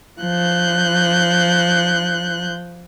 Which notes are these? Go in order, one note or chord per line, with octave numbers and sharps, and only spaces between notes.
F3 F#6 G6